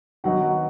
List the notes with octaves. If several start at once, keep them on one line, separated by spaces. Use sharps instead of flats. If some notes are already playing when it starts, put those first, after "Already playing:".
D#3 F#3 B3 D#4 F#4 F#5